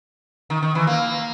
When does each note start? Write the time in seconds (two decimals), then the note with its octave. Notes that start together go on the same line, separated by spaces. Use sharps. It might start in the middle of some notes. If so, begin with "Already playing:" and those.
0.50 D#3
0.62 D#3
0.75 E3
0.87 A#3